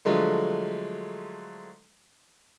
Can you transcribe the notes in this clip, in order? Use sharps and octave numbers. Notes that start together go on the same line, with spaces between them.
D3 F3 F#3 G#3 A3